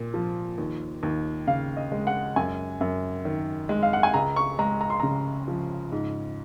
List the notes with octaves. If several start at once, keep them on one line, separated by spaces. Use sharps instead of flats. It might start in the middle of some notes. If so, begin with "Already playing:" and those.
Already playing: A#2
F3
D#2
D#2
C#3 F5
D#5
G#3
F#5
F#2 G#5
F#2
D#3
G#3
F5
F#5
G#5
C#2 A#5
C#6
G#3 A#5
A#5
C6
C#3 A#5
F3
G#2